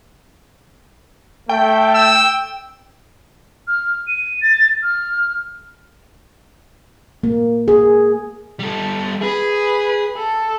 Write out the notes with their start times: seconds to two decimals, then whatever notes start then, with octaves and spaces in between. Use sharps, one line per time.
1.49 A3 G5
1.95 E6
3.68 F6
4.07 D#7
4.41 A6
4.83 F6
7.23 A#3
7.68 G#4
8.60 G3 A4
9.22 G#4 B4
10.16 A4